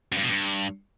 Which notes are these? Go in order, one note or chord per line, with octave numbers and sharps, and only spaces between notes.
F#2
G2
B2
G2